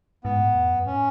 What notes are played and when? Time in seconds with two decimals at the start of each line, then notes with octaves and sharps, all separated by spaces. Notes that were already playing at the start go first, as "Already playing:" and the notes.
0.24 G#2 B3
0.40 A2
0.55 E2
0.70 F#2
0.86 A2 C#4